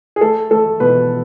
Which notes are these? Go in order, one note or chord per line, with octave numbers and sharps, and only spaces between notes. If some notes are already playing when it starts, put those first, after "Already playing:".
G#4
A3 A4
A3 A4
B2 B4